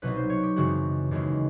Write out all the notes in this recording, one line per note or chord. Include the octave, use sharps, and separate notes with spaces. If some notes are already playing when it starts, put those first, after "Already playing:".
C2 B2 F#3 B3 D#4 B4
C5
C#5
G4
F#2 C#3 E3 G#3 C4 F#4
D#2 C#3 E3 G#3